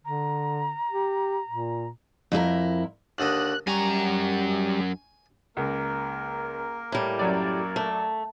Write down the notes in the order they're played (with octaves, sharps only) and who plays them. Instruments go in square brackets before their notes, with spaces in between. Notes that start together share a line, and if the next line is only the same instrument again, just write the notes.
[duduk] D3 [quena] A#5
[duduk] G4
A#2
[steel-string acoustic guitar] F2 E4 G#4 A#4
[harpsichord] D#2 D3 D#5 [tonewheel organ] F#6
[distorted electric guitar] F#2 A#5 [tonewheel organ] G3 [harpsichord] G#5 C#6
[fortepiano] C#2 [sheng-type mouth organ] A#3 A#4
[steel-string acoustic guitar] A2 G3
[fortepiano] F#2 F#3 D5
[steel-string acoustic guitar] A3